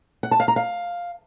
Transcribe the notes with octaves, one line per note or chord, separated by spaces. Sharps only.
F#5
A5
F5
A#5
F5